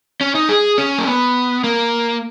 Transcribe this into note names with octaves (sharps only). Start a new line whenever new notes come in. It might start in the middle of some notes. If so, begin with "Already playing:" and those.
C#4
D#4
G#4
C#4
A#3
B3
A#3